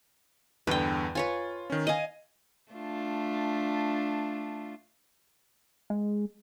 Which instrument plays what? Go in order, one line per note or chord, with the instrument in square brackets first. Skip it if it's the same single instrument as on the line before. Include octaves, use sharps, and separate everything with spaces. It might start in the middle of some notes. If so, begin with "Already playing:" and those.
[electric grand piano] E2 G2 D3 [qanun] B4 G5
[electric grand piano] F4 [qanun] B4 C#5 G#5
[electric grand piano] D#3 C#4
[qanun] D#5 F5 [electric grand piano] G#5 D#7
[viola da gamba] A3 D4 F4
[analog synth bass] G#3